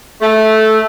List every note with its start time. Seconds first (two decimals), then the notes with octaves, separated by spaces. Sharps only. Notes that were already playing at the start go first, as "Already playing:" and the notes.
0.21 A3